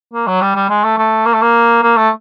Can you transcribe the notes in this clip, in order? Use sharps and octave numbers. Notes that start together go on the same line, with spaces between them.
A#3
F#3
G3
G3
G#3
A3
A3
A#3
A3
A#3
A#3
A3